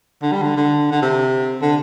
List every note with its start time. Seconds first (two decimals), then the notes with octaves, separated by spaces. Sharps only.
0.22 D3
0.32 G3
0.42 D3
0.57 D3
0.91 D3
1.02 C3
1.62 D3